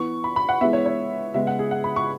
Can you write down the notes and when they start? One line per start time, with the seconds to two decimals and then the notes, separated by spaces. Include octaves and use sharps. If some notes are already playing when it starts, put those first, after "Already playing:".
Already playing: E3 B3 C#6
0.24 B5
0.36 B5
0.49 F#5
0.61 E3 G#3 B3 E5
0.73 C#5
0.86 C#5
1.34 C#3 G#3 B3 E5
1.47 F#5
1.59 G#4
1.71 F#5
1.84 B5
1.96 C#6